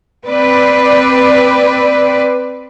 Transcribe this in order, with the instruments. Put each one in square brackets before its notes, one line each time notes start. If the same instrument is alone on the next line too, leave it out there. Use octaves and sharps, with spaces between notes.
[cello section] C4 B4 D5